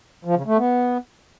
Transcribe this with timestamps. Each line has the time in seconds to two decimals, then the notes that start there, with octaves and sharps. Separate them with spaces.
0.25 F3
0.36 C#3
0.47 A3
0.57 B3